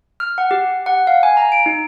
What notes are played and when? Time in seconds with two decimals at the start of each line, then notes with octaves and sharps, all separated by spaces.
0.20 F6
0.38 F#5
0.51 G4
0.86 F#5
1.07 F5
1.23 G#5
1.37 A#5
1.52 D7
1.66 D#4